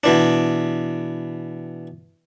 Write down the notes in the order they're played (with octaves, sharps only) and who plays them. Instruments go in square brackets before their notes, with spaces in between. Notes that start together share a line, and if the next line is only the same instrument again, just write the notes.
[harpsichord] B2 E3 D4